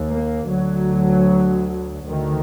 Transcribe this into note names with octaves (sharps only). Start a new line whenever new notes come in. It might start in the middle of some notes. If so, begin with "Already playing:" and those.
Already playing: D#2
A#3
D2 F#3
D2 D#3